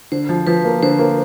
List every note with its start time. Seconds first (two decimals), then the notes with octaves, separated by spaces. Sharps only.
0.12 D3 C5
0.29 F3
0.47 F3 B4
0.65 A#3
0.83 D3 C5
0.99 A#3